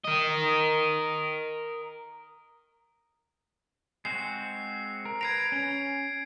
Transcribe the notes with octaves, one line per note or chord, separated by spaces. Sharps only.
A#4 D#5
G#3 C4 F#4 C7
A#4
B4 A#5 G#6 C7 D7
C#4